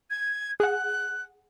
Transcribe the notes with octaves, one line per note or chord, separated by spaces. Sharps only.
G#6
G#4 F#5 F#6